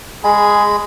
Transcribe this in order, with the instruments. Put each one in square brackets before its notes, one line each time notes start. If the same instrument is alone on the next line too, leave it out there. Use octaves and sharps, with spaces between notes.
[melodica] G#3 B5 [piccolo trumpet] G#4 [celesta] G#5